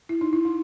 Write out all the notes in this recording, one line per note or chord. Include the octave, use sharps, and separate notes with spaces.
E4
D#4
E4
D#4